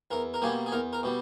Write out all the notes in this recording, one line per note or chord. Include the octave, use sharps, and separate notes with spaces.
E2 A#4
A#4
B2 G3 A#3 G#4
G#4
E2 A#4
A#4
B2 G3